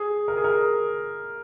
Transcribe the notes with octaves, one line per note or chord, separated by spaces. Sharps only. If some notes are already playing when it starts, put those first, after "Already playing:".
Already playing: G#4
A#4
G#4
A#4